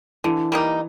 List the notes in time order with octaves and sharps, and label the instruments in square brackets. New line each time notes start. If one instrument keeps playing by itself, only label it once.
[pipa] D3 [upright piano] E3
[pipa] G3 A#3 D#4